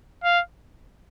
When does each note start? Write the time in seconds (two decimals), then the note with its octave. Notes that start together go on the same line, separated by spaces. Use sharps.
0.23 F5